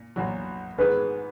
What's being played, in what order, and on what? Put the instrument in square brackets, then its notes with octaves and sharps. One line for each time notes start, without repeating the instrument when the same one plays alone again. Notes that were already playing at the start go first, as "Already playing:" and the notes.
Already playing: [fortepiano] A#2
B1 A#2 F#3
[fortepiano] G#2 D#3 G#3 B3 [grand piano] B4